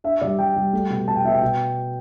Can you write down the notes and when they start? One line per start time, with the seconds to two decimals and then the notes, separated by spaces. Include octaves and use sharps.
0.04 D4 E5
0.22 G3 D5
0.39 G3 G5
0.56 G3
0.73 A3
0.90 B2
1.08 B2 A5
1.16 G5
1.25 B2 E5
1.33 G5
1.42 B2